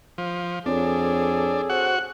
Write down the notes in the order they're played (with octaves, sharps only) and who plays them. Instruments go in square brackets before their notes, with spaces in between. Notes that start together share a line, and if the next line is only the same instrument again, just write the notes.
[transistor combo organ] F3
[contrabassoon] F2 [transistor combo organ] D4 [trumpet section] G#4 A4 [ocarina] C#5
[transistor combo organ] F#4 F#5 [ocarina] C5